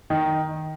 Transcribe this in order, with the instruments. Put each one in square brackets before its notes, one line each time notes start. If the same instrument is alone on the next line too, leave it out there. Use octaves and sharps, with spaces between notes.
[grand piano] D#3